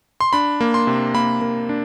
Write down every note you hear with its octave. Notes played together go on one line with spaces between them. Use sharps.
C6
D4 B5
A#3
C6
C3
A#3 B5
A#3
D4